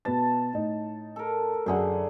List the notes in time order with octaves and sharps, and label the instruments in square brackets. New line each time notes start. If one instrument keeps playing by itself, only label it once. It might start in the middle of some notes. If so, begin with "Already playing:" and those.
[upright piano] B2 B3 A6 [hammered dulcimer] A5
[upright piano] A2 D#4
[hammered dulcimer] A4 A#4
[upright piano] F#2 F#5 [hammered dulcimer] D3 G#4 C5